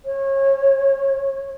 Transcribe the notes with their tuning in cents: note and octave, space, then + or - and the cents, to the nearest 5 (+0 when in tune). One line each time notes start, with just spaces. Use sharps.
C#5 -25